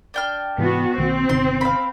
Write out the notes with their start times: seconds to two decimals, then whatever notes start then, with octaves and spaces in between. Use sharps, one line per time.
0.14 D4 G5 F6
0.58 G#2 C3 E3 B3 F#4
0.98 B1 D#3 A#3 C4
1.29 G1 C3 D#3 C6
1.61 F5 B5